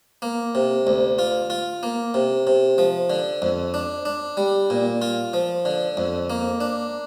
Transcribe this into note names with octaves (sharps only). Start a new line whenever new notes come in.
A#3
C3
D2
F4
F4
A#3
C3
C3
F3
D3
F2
D4
D4
G3
A#2
F4
F3
D3
F2
A#3
D4